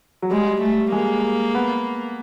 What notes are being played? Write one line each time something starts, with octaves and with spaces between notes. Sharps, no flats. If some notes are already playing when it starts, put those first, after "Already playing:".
F#3
G3 G#3
A3
G#3 A#3
B3